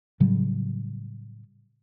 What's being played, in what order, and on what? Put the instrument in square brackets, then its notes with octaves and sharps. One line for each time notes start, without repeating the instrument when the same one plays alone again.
[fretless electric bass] A2 C#3 F#3 G3